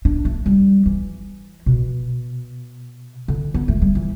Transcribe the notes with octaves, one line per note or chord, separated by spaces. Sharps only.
D4
A3
G3
E3
B2
D3
B3
A3
G3
E3